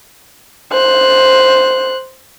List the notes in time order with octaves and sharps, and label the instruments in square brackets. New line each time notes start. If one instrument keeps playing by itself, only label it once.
[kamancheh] C5 F#6